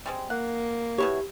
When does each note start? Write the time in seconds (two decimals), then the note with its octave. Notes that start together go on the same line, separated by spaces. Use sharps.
0.06 G3 G#3 C4
0.30 A#3 F#5
0.98 B2 E4 G4 C#5